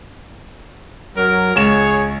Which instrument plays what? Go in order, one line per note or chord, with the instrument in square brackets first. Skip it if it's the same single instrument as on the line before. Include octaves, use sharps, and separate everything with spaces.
[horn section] F#2 F#3 A#4
[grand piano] C#2 E7 [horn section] G#4 C#5